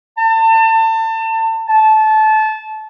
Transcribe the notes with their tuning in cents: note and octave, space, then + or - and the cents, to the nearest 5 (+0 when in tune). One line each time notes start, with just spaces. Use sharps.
A5 +30
A5 -20